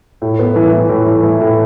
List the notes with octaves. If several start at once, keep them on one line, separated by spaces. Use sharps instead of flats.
A2
B3
E3
E3
A2
E3
E3
A2